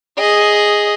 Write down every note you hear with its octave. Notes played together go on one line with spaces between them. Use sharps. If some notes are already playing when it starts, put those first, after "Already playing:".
G#4 D#5